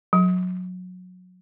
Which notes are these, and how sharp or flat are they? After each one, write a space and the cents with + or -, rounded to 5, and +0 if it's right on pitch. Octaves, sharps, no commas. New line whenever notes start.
F#3 -20